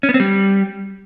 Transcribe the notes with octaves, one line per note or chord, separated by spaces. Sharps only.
C#4
B3
C4
G3